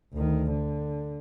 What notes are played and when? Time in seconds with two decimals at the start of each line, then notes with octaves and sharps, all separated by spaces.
0.13 D2 D#3
0.51 D3